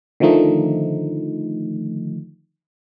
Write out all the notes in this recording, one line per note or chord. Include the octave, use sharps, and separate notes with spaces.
D3 D#3 F3 A3 D#4